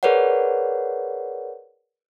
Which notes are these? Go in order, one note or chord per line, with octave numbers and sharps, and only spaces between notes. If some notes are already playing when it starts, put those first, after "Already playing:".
G#4 A#4 B4 C#5 D5 F#5